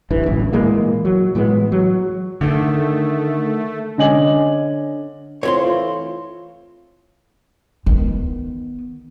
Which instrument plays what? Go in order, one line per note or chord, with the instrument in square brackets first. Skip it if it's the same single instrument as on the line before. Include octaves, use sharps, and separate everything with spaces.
[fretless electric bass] G#1 G2 E3
D1 A1 D2
A#2 E3 G#3 A#3
F#3
A2 E3 G#3 B3
F#3
[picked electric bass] D3 D#3 [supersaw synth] A3
[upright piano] D3 C#4 D#5 G#5 D6 F#7
[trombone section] E3 A3 F4 [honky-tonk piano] C4 [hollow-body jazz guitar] C#5 B5 C6
[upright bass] D#3 B3